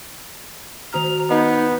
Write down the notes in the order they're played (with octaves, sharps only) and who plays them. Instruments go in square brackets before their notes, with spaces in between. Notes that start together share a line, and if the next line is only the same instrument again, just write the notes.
[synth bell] D#3 F#4 F6 [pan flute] A#5
[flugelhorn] B3 [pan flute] D#4 [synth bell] D#5